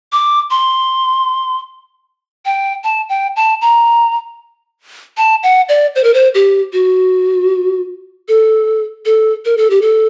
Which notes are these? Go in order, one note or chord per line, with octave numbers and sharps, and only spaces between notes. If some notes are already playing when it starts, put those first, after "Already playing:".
D6
C6
G5
A5
G5
A5
A#5
A5
F#5
D5
C5
A#4
C5
G4
F#4
A4
A4
A#4
A4
G4
A4